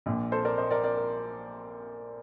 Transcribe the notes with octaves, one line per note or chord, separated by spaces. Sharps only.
A#1 A#2
A4 C5
A#4 D5
C5 D#5
A#4 D5
A#4 D5
A#4